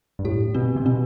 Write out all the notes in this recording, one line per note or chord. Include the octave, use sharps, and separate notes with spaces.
G2
A2 G4
B2 C4
C3
B2 C4